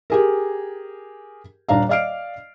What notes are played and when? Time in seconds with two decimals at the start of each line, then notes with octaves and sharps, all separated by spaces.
0.10 G4 G#4 A#4
1.69 D#1 D4 F5 A#5
1.89 D5 D#5 F5 F6 C7 D7